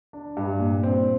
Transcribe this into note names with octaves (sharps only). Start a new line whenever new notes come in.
D4
G2
A#2
C4